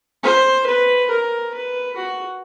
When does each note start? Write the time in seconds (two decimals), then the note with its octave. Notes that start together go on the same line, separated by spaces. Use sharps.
0.23 C5
0.67 B4
1.10 A#4
1.54 B4
1.96 F#4